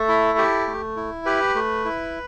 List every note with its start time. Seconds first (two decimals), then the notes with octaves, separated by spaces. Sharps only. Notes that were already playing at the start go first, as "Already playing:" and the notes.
Already playing: A3 A4
0.08 E4
0.38 G4
0.67 A3
0.97 E4
1.26 G4 B4
1.55 A3
1.85 E4